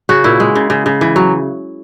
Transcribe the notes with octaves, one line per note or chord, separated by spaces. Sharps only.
C#3 F#4
A#2 E4
G#3
C#3
C#3
C#3
E3
F#3